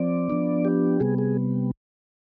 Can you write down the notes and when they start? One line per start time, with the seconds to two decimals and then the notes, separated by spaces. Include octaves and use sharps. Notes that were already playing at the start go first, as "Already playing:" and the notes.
Already playing: F3 C4 D5
0.30 F3 B3 D4
0.65 G4
1.00 C3 G3 B3 G#4
1.18 G#4